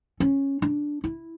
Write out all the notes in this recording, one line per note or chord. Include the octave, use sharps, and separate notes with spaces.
C#4
D4
E4